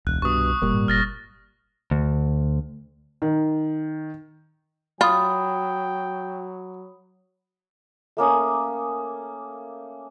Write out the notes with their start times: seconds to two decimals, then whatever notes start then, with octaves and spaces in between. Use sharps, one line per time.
0.07 E1 C#2 F#6
0.22 C2 G2 B2 C#6 D#6
0.62 F#1 A#2 G3 A#3
0.74 G#2
0.88 F#1 F6 A6 A#6
1.91 D2
3.22 D#3
5.01 F#3 F4 G5 B5 D#6
8.17 A3 A#3 C#4 D#6